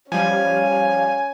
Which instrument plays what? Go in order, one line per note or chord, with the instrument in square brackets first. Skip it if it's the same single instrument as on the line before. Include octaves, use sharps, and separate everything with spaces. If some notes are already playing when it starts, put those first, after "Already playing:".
[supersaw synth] F3 G3 [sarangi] C#4 [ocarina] F5 [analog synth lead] G#5